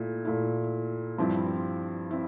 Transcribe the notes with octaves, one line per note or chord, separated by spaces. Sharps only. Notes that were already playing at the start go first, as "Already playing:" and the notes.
Already playing: A#2 A3 E4
A#2 A3 E4
G2 F3 C4 E4
C4 E4